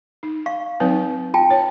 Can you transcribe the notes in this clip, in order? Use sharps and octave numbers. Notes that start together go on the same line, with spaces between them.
D#4
F5 C#6
F#3 C4 D#4 B4
F4 G5 A5
C#5